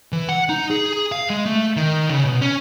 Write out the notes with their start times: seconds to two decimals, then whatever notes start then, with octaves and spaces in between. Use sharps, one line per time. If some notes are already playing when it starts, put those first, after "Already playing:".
0.12 E3
0.29 F#5
0.49 D#4
0.70 G#4
1.12 F5
1.30 G#3
1.46 A3
1.76 D#3
2.09 C#3
2.25 B2
2.41 C#4